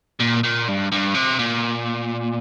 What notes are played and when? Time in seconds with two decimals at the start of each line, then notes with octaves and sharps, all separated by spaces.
0.20 A#2
0.43 A#2
0.68 G2
0.92 G2
1.14 C3
1.39 A#2